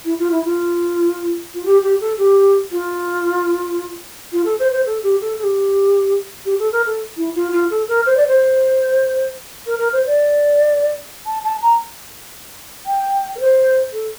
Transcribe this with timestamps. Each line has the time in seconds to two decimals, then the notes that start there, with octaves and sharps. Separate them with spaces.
0.04 E4
0.19 F4
0.31 E4
0.45 F4
1.54 F4
1.65 G4
1.83 G4
2.01 A4
2.18 G4
2.72 F4
4.32 F4
4.45 A4
4.59 C5
4.72 C5
4.86 A4
5.03 G4
5.21 A4
5.39 A4
5.43 G4
6.45 G4
6.59 A4
6.72 A#4
6.86 A4
7.16 E4
7.35 F4
7.52 F4
7.70 A4
7.88 A#4
8.06 C5
8.17 D5
8.27 C5
9.66 A#4
9.79 A#4
9.93 C5
10.06 D5
11.26 A5
11.44 A5
11.62 A#5
12.86 G5
13.35 A#4
13.40 C5
13.92 A4